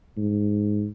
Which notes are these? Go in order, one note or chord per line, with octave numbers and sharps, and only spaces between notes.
G#2